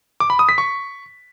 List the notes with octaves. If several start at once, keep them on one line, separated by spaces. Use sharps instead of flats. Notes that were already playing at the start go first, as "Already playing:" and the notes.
D6
B5
D#6
B6
C#6